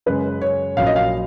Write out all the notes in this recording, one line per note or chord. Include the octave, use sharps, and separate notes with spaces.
F#2 C#3 G#3 B4
C#5
A#1 A#2 F#3 C#4 F5
D#5
F5